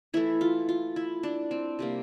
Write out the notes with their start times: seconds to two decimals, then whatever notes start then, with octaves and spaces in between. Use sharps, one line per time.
0.14 E3 A3 E4
0.41 F4
0.69 F4
0.96 E4
1.23 D4
1.51 C4
1.79 C3 G3 A#3